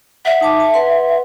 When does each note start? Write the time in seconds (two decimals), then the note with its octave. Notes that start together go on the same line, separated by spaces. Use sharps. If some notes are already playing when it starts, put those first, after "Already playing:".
0.25 E5 F#5
0.41 D#4 A5 D6
0.60 A5
0.74 B4 F#5 C6